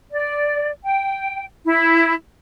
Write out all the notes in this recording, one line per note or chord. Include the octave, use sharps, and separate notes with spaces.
D5
G5
E4